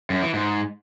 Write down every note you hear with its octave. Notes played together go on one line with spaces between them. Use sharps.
F#2
E3
G#2